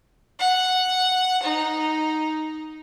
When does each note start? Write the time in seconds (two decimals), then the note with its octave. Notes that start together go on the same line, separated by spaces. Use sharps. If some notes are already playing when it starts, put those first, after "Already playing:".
0.39 F#5
1.43 D#4